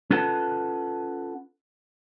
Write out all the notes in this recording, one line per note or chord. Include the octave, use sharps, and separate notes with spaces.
C#4 F4 A4 B4 F#5 A5